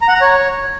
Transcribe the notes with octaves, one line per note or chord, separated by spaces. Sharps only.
A#5
F#5
A#5
C#5